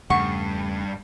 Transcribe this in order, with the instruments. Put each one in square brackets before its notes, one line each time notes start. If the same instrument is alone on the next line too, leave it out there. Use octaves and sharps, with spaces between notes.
[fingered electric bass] E2 C#3 A3 [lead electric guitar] G2 [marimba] F#5 [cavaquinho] C#6